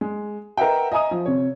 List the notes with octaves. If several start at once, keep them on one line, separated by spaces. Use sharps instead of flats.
G#3
A#4 B4 D#5 E5 F#5 G5
D#5 E5 G#5 A#5 D#6
F3
C3 C#5